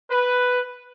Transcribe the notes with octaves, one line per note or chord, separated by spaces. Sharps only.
B4